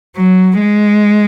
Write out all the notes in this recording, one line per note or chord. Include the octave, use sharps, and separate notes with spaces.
F#3
G#3